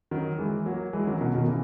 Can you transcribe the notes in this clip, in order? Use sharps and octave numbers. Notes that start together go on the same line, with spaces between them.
D#3 F#3
E3 G#3
F#3 A#3
E3 G#3
D#3 F#3
B2 D#3
B2 D#3
C#3 E3